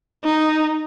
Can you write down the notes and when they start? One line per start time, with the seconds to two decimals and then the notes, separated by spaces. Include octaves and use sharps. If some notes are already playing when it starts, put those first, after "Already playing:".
0.24 D#4